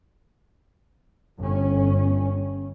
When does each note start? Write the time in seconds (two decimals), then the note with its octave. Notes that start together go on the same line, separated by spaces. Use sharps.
1.38 G1 C#4